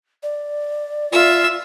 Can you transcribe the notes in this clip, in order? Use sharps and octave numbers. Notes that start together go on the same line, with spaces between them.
D5
F4 E5 E6